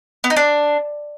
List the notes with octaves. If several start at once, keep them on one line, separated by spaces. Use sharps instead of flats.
B3
D#4
D4